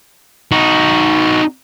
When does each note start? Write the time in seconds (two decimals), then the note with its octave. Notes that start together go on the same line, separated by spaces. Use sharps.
0.51 D#4 F#4